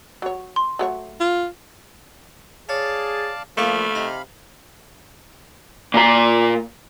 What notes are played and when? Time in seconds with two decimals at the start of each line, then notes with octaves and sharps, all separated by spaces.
0.22 F#3 C#5
0.56 C6
0.79 F#3 A3 C#5
1.20 F4
2.69 G#4 C#5 D5 F5 A5
3.57 F3 A3 A#3 D5 F5 B5 C#6
3.95 C3 D#4
5.94 A#2 A#5